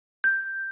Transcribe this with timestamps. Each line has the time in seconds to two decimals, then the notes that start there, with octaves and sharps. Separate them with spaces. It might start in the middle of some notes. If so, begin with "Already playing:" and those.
0.24 G6